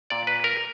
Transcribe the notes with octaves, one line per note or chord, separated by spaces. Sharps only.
A#2 D5
B4
A#4